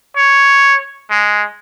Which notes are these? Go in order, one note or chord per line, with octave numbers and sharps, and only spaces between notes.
C#5
G#3